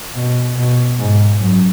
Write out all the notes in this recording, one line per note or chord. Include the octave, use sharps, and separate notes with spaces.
B2
B2
G#2
F#2